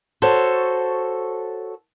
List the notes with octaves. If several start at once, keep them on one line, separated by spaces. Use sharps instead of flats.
F#4 A4 C5 C#5